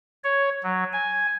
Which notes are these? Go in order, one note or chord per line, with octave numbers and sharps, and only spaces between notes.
C#5
F#3
G#5